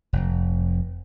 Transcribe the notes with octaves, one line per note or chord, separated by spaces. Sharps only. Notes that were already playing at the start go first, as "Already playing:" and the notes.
F1